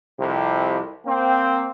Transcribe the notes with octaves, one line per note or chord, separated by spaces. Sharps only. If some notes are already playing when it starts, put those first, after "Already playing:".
C2 F2 C3
A#3 C4